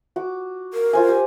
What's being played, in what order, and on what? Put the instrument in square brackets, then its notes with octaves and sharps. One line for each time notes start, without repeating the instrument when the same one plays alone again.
[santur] F#4 D6
[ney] A#4
[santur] F4 C5 G#5
G4